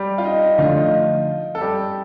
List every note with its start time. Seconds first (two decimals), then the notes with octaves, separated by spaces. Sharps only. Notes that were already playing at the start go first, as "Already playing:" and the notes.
Already playing: G3 G4
0.18 F4
0.24 D#4
0.41 D#4
0.58 D3 F3 A3 D4 F4
0.75 D#4
1.55 A4
1.61 G3 G4